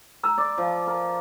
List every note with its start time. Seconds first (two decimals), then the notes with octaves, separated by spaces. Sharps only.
0.23 A#5 E6
0.38 D5
0.58 F3
0.87 A#4